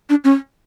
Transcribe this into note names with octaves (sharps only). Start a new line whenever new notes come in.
D4
C#4